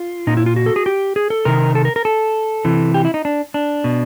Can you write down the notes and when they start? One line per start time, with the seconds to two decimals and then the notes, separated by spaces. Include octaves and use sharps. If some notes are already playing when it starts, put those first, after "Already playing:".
Already playing: F4
0.27 A#2 D#4
0.37 E4
0.46 F4
0.56 F#4
0.66 A4
0.76 G#4
0.86 G4
1.16 G#4
1.30 A4
1.45 C3 D#3 A#4
1.75 A4
1.85 A#4
1.96 A#4
2.05 A4
2.65 C3 E3
2.94 G4
3.05 E4
3.14 D#4
3.25 D4
3.54 D4
3.84 B2